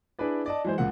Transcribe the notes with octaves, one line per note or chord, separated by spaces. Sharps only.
D4 E4 G#4 B4 D5
D5 D#5 A5
E3 F#3 G#3 C5
C#2 A#2 F#5